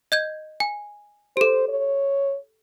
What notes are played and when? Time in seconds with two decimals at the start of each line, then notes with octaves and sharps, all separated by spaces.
0.12 D#5 G6 G#6
0.60 G#5
1.37 G4 A4 C5
1.69 C#5